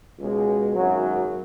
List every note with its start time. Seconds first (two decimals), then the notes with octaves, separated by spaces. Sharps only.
0.19 C#2 B2 G#3
0.75 G#1 F#2 C#3 F#3